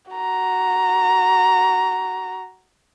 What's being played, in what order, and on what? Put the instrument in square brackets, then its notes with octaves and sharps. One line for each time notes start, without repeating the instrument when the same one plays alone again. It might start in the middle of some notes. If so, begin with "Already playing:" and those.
[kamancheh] F#4 A#5